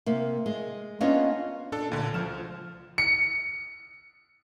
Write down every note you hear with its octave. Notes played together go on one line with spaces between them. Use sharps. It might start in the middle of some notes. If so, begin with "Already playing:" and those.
C3 A#3
G#3
A#3 B3 C#4 D4 F4 D#5
A#2 D4 A4
D2 D3
C#2 F3 F6 E7
C#7